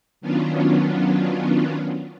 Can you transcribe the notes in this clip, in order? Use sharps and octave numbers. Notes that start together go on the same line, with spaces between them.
D#3 F#3 B3 C#4 D4 F4